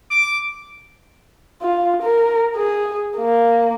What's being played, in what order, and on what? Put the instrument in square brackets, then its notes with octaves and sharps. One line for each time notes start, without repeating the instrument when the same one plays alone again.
[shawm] D6
[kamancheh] F4
A#4
G#4
A#3